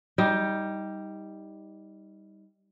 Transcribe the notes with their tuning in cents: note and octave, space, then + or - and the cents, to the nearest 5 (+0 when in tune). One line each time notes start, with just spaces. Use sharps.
G3 +0 D#4 +20